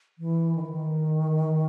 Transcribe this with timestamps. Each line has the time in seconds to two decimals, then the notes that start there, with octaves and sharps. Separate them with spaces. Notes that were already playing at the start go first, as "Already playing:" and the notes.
0.19 E3
0.55 D#3
0.62 E3
0.70 D#3